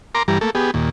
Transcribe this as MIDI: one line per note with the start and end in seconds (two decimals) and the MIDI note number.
0.15 0.23 70
0.15 0.23 82
0.15 0.23 84
0.15 0.23 86
0.28 0.38 43
0.28 0.38 52
0.28 0.38 55
0.28 0.38 82
0.41 0.50 57
0.41 0.50 58
0.41 0.50 69
0.55 0.71 59
0.55 0.71 67
0.55 0.71 68
0.74 0.89 39
0.74 0.89 46